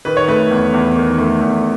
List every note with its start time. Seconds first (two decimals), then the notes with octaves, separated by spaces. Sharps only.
0.05 D#3 B4
0.17 C#5
0.28 A3 B4
0.51 E2
0.74 E2
0.96 D#3
1.18 A3
1.41 E2